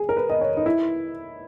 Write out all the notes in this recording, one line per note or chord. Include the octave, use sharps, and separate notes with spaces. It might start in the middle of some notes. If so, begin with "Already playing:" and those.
Already playing: G#4
A#4
B4
D#5
C#5
D#4
E4